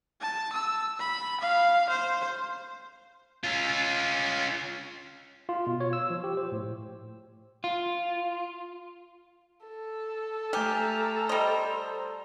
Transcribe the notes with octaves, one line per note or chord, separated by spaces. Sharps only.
A5
E6
B5
F5
C5
C#4 F4
F4
B2
C#5
E6
F3
G4
C5
A2
F4
A4
A3 G4 G#5 A#5 F6
G3 C5 D#5